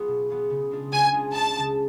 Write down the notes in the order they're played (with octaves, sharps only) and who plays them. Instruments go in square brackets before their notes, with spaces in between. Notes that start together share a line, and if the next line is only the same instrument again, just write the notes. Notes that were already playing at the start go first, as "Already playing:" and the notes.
Already playing: [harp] F#3 B3 F4 G#4
B2
F#3 B3 F4 G#4
C#3
G#3 D4 F4 G#4
[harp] C#3 [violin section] G#5
[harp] G#3 D4 F4 G#4
[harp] C#2 [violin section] A5
[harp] C#3 G#3